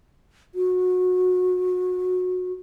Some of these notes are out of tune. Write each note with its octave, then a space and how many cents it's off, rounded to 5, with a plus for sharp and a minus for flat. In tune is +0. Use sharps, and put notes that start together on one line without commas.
F#4 -20